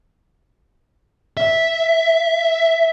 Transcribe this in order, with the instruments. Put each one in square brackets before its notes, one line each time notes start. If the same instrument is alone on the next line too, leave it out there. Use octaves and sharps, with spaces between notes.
[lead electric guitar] E5